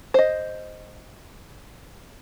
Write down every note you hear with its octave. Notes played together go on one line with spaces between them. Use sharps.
C5 D#5